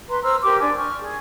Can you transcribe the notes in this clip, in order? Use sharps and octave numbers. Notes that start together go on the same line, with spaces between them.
B4 A#5 C6
C5 A#5 E6 F6
G4 A#4 C6 D6
D4 G#5 C6
C#6 F6
G#4